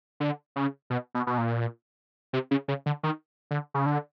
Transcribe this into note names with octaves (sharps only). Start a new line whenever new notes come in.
D3
C#3
B2
B2
B2
A#2
C3
C#3
C#3
D3
D#3
D3
C#3
D3